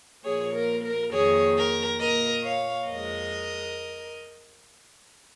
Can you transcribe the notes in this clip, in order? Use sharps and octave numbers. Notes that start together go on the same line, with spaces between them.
A#2 F3 A#3 G#4 C#5
A#4
A#4
F2 D#3 A#3 G#4 C#5
A#4
A#2 A#3 A#4 D#5
C#5 F5
F2 F3 G#3 A#4 D#5